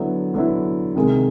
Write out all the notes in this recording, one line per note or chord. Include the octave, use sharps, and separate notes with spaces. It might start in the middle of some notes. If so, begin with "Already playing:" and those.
Already playing: D3 F#3 B3 E4
D3 F#3 B3 E4
C3 D#3 G#3